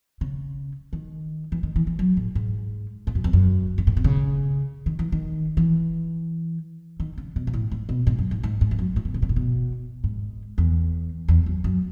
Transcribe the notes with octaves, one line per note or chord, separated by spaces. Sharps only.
C#3
D#3
E3
D#3
E3
E3
F#3
A2
G#2
G#2
F#2
E2
F#2
G#2
A2
B2
C#3
D#3
E3
D#3
E3
D#3
C#3
B2
G#2
A2
G#2
B2
G#2
F#2
G#2
G#2
G#2
E2
F#2
A2
B2
C#3
B2
A2
B2
G#2
E2
E2
F#2
F#2